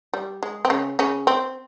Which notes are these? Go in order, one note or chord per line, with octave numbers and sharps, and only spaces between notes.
G3
G#3
C4
C#3 C#4
C#3 C#4
C4